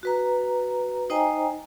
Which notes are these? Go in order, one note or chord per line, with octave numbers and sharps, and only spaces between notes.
F#4 B4 A#5
D#4 C5 D#5 G5 G#5 A#5